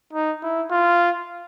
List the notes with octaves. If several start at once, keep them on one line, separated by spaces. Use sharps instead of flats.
D#4
E4
F4